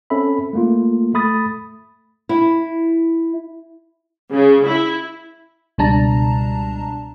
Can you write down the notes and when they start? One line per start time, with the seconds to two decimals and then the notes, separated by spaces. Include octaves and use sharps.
0.10 C4 C#4 A4 E5 B5
0.53 A3 A#3 F4
1.14 A3 B5 D#6 A6
2.29 E4
4.32 C#3
4.66 E4
5.78 C#2 B2 G3 D4 A5 A#5